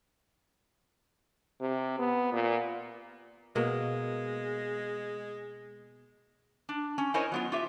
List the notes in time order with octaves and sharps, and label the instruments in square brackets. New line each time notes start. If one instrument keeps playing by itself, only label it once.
[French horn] C3
B3
A#2
[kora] B2 A#3 [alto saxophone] G#3
[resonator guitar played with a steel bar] D4
C#4
E4 A#4 C5 C#5 D#5 G#5
F#3 B3 F4
F4 G4 E5